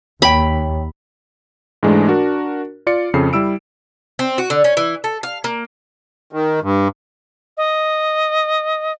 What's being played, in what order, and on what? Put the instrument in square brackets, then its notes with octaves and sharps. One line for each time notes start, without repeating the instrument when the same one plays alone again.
[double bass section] D#2 [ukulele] C#5 G5 [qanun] B5
[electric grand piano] G#2 E3 G#3 A3 D4
D4 F#4 A#4
F4 D5 C#7
F2 C#3 A4 C7
G3 E4 E6 D7
[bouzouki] C4
F#4
D3
C#4
E3
A4
F5
A#3
[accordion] D#3
G2
[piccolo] D#5